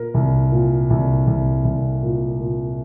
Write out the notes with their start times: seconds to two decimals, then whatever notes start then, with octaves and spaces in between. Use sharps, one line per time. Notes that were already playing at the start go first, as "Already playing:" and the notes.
Already playing: A#2 A#4
0.14 C2
0.52 A#2
0.90 C2
1.27 C2
1.65 C2
2.03 A#2
2.40 A#2